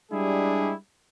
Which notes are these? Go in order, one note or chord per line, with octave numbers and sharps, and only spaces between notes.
G3 G#3 D4 E4 G4 G#4